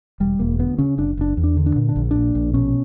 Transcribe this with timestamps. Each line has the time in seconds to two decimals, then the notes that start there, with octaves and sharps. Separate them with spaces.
0.20 E1 G3
0.39 E1 A#3
0.59 D2 B3
0.78 C#3 C#4
0.98 F#1 D4
1.17 F#1 D4
1.37 E2
1.44 D4
1.57 D3
1.66 D4
1.76 A#2
1.89 D4
1.96 A#1
2.11 A#2 D4
2.35 A#1
2.54 B2 C#4